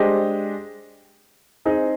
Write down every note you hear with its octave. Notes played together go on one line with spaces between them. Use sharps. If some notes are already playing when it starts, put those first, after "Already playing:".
Already playing: G#3 D4 G4 C5 D#5
C4 D#4 G#4 D#5